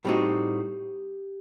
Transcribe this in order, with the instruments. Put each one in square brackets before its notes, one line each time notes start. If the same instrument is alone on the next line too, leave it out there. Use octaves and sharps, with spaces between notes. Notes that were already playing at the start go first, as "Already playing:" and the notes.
[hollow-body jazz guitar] A2 G3 C4 D#4 F#4 [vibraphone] G4